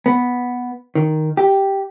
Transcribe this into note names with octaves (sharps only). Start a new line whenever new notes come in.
B3
D#3
G4